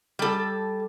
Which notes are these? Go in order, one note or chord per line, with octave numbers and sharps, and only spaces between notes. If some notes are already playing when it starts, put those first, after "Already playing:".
G3 A4